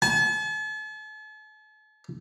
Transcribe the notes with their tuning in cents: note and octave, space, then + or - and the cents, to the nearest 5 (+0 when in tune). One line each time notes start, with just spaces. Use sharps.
A5 -45